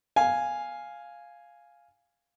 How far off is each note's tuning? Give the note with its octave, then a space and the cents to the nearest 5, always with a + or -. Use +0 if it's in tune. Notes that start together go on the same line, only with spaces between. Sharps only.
F5 +0 G#5 +0